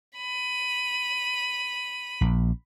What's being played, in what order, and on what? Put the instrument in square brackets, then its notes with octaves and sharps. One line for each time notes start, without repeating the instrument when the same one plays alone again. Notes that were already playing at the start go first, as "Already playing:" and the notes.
[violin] B5 D#7
[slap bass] A#1